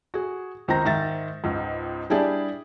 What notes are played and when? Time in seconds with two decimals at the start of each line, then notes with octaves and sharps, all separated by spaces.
0.14 F#4 G#4
0.68 C#2 D#3 C4 D#4 A#5 A#6
0.85 G#2 D#3 E5 A6
1.44 C#2 G#2
2.10 G3 D4 E4 G4 G#4 D5